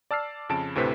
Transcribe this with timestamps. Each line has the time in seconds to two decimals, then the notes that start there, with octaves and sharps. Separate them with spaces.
0.11 D5 A5 E6 F6 C7
0.49 F2 C#3 A5 D7
0.75 D2 A2 C3 B4 C5 B6